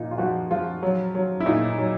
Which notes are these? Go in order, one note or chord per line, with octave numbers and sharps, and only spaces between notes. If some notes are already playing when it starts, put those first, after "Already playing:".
Already playing: A#2 F3 D#4
F4
F3 F#4
F3 F4
F#3
F#3
E4
A#2 D#4
F#3